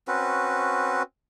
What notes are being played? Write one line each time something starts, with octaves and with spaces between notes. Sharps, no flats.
C4 C#4 F#4 B4